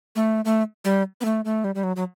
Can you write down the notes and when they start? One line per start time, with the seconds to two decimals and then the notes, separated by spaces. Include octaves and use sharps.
0.16 A3
0.45 A3
0.85 G3
1.21 B3
1.25 A3
1.45 A3
1.64 G3
1.75 G3
1.84 F#3
1.96 F#3